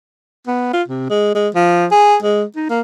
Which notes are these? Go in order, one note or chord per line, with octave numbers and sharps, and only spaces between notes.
B3
F4
C3
G#3
G#3
F3
G#4
G#3
D#4
A#3